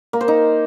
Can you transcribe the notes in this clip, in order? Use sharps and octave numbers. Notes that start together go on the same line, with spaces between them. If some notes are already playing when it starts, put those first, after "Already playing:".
A#3
C5
D#4